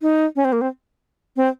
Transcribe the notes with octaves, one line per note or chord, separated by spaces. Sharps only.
D#4
C#4
C4
A#3
C4
C4